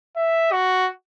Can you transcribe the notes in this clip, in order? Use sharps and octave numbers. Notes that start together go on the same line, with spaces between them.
E5
F#4